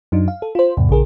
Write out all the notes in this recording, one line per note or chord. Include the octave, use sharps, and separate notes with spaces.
F#2 F#3 D4 D#4
F5
A4
F4 C5
E2 G#2 C3
A#1 C#3 G#4 A#4